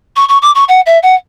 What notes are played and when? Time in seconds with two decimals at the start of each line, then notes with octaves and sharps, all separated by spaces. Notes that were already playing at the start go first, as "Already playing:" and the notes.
0.16 C#6
0.28 C#6
0.42 D6
0.54 C#6
0.68 F#5
0.86 E5
1.02 F#5